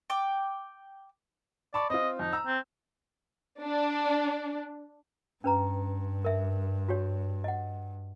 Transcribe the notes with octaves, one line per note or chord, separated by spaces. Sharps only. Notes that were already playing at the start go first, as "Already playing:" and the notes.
G5 D6
D5 A5 B5 C#6
C4 F4 D#5
F2 D#4
A#5 E6
C4
D4
G2 C#4 B4 A#5
A#4 E5
F#4 G4 C#5
D#5 F#5